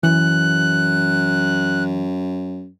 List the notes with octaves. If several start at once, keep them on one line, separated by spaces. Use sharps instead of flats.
F#2 E3 F#6